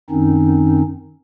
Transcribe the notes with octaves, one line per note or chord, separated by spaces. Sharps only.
F#2 D#3 C4 C#4 D#4